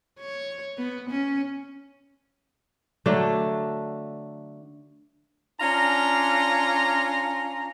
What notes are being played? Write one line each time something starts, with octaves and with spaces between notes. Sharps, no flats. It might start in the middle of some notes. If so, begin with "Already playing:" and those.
C#5
B3
C#4
D3 F#3 A3 D4
C#4 D4 F4 A#5